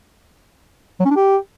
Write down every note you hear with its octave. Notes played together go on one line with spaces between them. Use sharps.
F#3
C#4
D4
G4